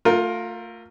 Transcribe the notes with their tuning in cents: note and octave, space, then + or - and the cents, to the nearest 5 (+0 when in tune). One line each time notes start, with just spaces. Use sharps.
A3 +35 F4 +20 A#4 +0